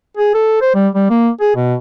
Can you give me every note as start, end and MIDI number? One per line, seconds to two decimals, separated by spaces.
0.17 0.33 68
0.35 0.57 69
0.62 0.72 72
0.75 0.88 55
0.95 1.06 55
1.10 1.29 58
1.41 1.51 68
1.56 1.74 47